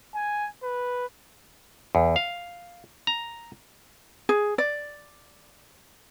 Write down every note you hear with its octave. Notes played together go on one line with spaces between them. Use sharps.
G#5
B4
E2
F5
A#5
G#4
D5